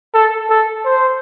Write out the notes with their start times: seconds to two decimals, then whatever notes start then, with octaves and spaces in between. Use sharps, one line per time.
0.14 A4
0.50 A4
0.85 C5